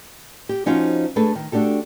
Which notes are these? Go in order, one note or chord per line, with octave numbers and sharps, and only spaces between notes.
G4
F3 C#4 D#4 F#4 C5 F5
A3 D4 G#4 A4 B4
D#3
A3 D4 F#4 G4 A4